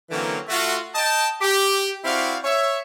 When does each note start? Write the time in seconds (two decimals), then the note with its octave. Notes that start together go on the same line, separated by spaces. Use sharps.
0.10 D3 E3 F#3 A#3 C4 C#4
0.48 A3 F4 F#4
0.95 D#5 G5 A5
1.42 G4
2.05 C4 E4 F#4 D5 F5
2.45 C#5 E5